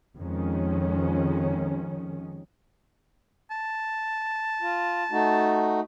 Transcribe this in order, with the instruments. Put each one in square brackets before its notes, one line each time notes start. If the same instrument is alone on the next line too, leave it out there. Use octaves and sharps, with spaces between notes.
[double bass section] F2 D#3 G#3 C#4
[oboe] A5
[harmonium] F4
A3 D#4 F#4